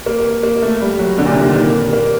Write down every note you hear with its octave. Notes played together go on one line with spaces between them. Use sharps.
A#3
A#3
A3
G3
F#3
D3
A#2
C3
D#3
A#3
A#3